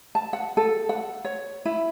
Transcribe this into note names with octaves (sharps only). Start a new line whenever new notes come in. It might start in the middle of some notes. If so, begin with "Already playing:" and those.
A5
F#5
A4
F#5
C#5
E4